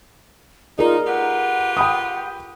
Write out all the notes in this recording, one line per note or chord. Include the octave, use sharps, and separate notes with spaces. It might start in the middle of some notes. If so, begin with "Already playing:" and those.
D#4 F4 G#4 A#4 D5
F4 G4 B4 F#5
G5 B5 D#6